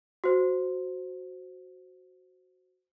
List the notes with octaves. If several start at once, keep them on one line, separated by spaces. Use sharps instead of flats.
F#4 C5